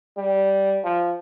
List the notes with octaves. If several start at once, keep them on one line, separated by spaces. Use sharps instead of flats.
G3
F3